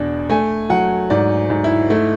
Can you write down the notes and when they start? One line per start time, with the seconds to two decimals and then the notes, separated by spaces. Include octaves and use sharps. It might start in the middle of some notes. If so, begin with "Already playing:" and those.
Already playing: E2 B2 D4
0.30 A3 G#5
0.70 F#3 F#5
1.10 G#2 D5
1.50 G#2
1.64 E4
1.90 A3 E4